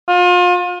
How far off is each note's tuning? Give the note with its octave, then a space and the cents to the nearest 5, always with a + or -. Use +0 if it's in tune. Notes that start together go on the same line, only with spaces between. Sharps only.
F4 +35